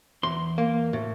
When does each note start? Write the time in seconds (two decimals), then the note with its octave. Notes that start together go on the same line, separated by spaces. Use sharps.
0.23 E2 C6
0.58 A#3
0.93 A2